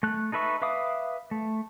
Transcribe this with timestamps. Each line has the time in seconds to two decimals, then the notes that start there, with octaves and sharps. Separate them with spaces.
0.03 A3 F#6
0.32 D#4 A4 B4 E5 C#6
0.62 B4 E5 F5 D6 D#6
1.31 A3